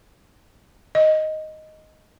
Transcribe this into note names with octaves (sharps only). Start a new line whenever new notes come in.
D#5